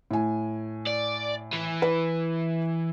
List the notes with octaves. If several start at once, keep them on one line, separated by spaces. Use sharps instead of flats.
A2 G#5
D5
E3
B4